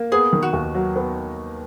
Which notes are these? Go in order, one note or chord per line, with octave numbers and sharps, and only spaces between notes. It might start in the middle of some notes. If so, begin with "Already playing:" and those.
Already playing: A#3
B3 G#4
D#3
F#4
D#2
F#3
B3